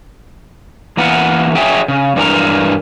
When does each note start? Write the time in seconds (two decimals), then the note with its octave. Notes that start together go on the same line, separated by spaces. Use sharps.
0.97 E3 A#3 B3 A#4 F#5
1.55 F#3 G#4 E5 G5 G#5
1.88 C#3
2.16 G2 E3 G#3 F#4 A#4 A#5